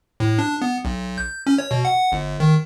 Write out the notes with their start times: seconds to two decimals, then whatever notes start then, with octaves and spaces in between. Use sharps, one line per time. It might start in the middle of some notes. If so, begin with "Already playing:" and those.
0.20 A2
0.39 D4
0.62 B3
0.85 B1
1.18 G6
1.47 C#4
1.58 C#5
1.71 B2
1.85 F#5
2.12 G1
2.40 D#3